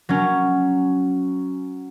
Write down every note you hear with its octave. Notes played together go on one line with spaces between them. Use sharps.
F#3 C#4